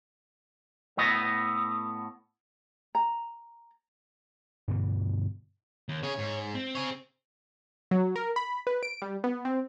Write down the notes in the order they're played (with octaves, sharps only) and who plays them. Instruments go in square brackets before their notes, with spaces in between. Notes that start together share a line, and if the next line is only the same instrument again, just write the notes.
[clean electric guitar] A2 A3 B3 D#5
[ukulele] A#5
[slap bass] G2 B2 D3 E3
[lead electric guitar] D#2
[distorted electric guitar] C#3 G#4 [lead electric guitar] C#5
[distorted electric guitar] G#2
[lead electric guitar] C4
[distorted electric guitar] G#4 C#5
[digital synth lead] F#3
A#4
B5
B4
D7
G3
B3
C4